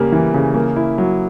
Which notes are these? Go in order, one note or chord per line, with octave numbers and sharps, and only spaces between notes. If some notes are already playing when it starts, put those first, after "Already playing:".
Already playing: C#3 G3 A#3
E3
C#3
A#3
E4
F#3